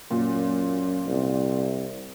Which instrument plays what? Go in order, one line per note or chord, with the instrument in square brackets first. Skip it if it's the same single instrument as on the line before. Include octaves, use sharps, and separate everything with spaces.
[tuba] F#2 [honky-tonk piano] A#2
[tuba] C2